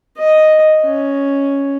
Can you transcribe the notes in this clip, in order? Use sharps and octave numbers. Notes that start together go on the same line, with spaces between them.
D#5
C#4